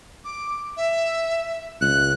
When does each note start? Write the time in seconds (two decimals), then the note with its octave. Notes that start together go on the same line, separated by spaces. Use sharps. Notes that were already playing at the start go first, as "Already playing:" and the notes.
0.24 D6
0.77 E5
1.81 C#2 F#6